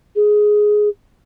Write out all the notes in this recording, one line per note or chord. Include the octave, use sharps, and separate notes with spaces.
G#4